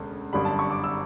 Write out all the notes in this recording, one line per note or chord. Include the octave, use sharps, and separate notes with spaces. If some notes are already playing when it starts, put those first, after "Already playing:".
Already playing: E1 D2 C#3
G1 F#2 D3 G3 B5
A5
C#6
D6
E6